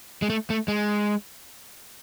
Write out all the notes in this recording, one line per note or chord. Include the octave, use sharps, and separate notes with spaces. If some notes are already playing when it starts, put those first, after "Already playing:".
G#3
A3
A3
G#3